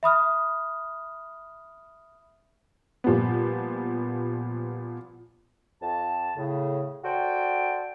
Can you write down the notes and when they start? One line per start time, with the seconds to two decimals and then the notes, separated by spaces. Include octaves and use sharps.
0.03 E5 B5 D#6 F6
3.04 A#2 F3 G3 B3
5.82 F2 A5
6.37 A2 C#3
7.04 F#4 A4 C5 D5 G5